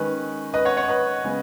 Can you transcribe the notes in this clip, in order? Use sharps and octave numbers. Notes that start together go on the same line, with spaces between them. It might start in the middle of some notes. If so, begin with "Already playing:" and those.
Already playing: D#3 G#3 C#4 B4
B4 D#5
C#5 F#5
C#5 F#5
B4 D#5
C#3 G#3 B3